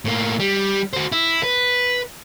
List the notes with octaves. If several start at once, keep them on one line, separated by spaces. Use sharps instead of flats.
A2 A#3
G3
F#4 C5
E4
B4